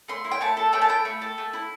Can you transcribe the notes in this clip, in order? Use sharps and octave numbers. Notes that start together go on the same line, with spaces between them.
A3 C6
E4
G5
A3 A5
A4
A3 G5
A5
E4 G5
A3
A4
A3
E4